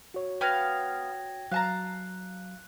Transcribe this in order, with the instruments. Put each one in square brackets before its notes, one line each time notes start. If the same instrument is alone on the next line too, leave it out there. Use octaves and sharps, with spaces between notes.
[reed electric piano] F#4 C#5
[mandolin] B3 F5 [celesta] G5 G#6 A#6
[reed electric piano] F#3 [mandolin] F5 A5 A#5 [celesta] F#6